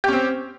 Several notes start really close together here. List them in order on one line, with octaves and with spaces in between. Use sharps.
G4 C#4 C4